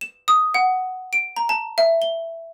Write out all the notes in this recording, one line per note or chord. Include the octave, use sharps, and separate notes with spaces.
E7
D#6
F#5
D7
A#5
A5
E5
G7